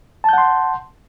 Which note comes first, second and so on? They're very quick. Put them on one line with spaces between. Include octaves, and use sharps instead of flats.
A5 G6 F#5 C6